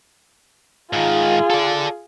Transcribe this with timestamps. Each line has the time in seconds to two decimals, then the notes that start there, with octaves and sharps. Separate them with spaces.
0.93 G#2 D#3 F4 G#4
1.50 A4 D5